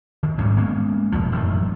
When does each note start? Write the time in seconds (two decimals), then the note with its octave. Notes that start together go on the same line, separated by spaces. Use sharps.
0.23 D#3
0.38 A1 G#2 G3 C#4
0.57 G#3 A#3 B3 C#4
1.12 F1 A#1 F3
1.32 E1 F#2 A2 D#3